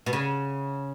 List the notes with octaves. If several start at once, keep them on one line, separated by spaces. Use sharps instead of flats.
B2
C#3